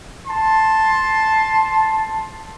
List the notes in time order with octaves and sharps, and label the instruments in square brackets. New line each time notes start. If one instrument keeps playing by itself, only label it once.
[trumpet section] A5 C6